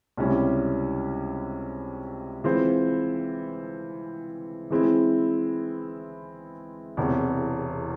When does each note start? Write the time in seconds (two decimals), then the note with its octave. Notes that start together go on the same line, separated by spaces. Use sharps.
0.17 C#2 C3 G3 C#4 E4
2.44 E3 G#3 C4 F4 C5
4.70 E3 G#3 C4 E4
6.97 E1 E2 C3